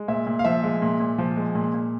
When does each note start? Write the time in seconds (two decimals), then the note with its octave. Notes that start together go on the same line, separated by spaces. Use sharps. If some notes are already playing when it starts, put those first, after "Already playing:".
Already playing: G#3
0.08 A#2 E5
0.27 A#2
0.39 F5
0.45 F3 E5
0.63 G#3
0.82 A#2
1.00 A#2
1.18 F3
1.36 G#3
1.55 A#2
1.74 A#2